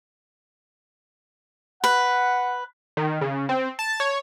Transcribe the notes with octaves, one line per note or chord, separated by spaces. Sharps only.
B4 F#5
D#3
C#3
C4
A5
C#5